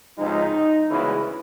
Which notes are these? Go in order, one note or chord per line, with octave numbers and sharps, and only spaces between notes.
C#2 C3 F3 G#3 D#4
D2 C#3 E3 G#3 B3 E4